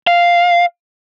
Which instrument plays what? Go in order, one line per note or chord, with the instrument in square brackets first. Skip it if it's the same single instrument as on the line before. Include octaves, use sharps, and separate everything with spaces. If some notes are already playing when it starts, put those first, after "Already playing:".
[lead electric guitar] F5